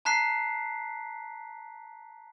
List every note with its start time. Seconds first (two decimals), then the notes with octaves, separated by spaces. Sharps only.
0.05 A5 A#5 F#6 B6 C7